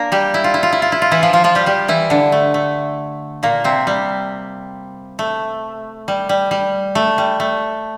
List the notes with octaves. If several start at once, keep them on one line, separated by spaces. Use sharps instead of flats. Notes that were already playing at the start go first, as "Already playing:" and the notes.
Already playing: A#3 D4 A#4
G3 G4
E4
F4
E4
F4
E4
F4
E4
F4
E3 E4
F3 F4
F3 F4
F3 F4
G3 G4
G3 G4
E3 E4
D3 D4
A3
A3
A#2 A#3
C3 C4
G3
A3
G3
G3
G3
A3
G3
A3